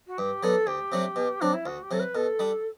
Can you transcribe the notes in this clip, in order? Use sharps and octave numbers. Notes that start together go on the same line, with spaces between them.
F#4
G2 G4
F#3 B3 D4 A4
D2 G4
C3 F#3 A3 D4
B2
F#3 C4 D4
E4
D2 F#4
G4
C3 F#3 A4
B4
B2 A4
G3 D4